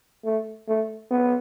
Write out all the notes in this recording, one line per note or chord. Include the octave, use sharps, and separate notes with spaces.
A3
A3
B3